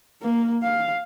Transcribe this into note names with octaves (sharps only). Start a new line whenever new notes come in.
A#3
F5